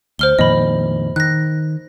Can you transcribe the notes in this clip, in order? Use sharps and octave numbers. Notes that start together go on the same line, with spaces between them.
D2 C5 F6 G7
F2 A#2 D#3 D#5 B5
D#3 F#6 A#6